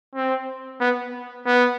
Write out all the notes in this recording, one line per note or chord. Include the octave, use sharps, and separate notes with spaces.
C4
B3
B3